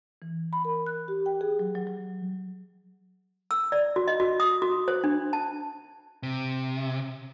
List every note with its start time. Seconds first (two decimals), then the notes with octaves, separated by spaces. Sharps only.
0.22 E3
0.53 B5
0.65 A#4
0.86 F#6
1.08 G4
1.26 G5
1.41 G#4
1.59 F#3
1.75 F#3
1.87 F#3
3.51 E6
3.72 D5
3.96 F#4
4.08 D#5
4.20 F#4
4.40 D#6
4.62 F#4
4.88 C5
5.04 D4
5.33 A5
6.23 C3